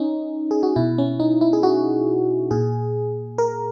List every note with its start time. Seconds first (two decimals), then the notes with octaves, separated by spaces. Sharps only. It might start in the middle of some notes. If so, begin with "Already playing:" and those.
Already playing: C#4 D#4
0.51 G#4
0.63 F#4
0.76 B2 E4
0.98 C#4
1.20 D#4
1.41 E4
1.53 G#4
1.63 F#4
2.51 A#2 G#4
3.38 A#4